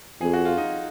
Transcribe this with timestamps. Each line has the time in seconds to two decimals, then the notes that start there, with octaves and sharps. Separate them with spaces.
0.21 F2 G#4
0.33 F#4
0.45 F4
0.57 D#4